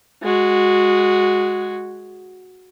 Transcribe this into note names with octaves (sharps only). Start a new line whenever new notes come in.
G#3 F#4